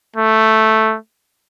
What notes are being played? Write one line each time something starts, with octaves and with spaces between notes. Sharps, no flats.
A3